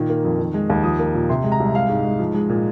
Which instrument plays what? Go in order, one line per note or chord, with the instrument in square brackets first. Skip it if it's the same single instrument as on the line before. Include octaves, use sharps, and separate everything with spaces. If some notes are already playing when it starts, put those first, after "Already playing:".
Already playing: [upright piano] A#2 D#3
A#3
F2
D#3
G#3
D#2
F3 D#6
A#3
A#2
C3 C6
G#3
A#5
C2
G#3 F5
G#2
G#2
F3
G#3
A#2